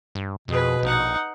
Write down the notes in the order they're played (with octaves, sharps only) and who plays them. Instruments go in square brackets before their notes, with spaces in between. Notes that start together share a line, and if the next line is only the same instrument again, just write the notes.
[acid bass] G2
[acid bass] F2 [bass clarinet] B2 [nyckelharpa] G#4 B4
[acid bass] A#1 [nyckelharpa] D#4 F#5